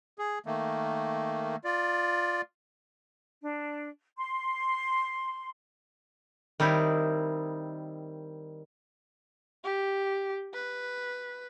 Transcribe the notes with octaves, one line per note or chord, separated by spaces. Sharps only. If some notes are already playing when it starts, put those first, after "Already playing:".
G#4
D#3 A3 A#3
F4 D5
D4
C6
D#3 G3 C4 D#4 E4
G4
B4